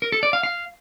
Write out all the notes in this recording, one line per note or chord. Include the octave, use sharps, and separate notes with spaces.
A#4
A4
D5
F5
F5